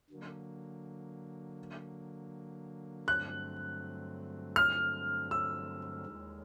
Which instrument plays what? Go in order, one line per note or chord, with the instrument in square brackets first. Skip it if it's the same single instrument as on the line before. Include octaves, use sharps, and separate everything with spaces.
[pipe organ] D3 F#3 A#3
[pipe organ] G2 D3 F#3 A3 C4 [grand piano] F#6
[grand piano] F6
E6
[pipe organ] D#2 D#3 G#3